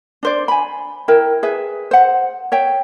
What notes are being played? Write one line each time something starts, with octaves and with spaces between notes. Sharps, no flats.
D4 C5 D5
G#5 B5
E4 A#4 G5
G#4 B4 E5
C5 F#5
C#5 E5 G5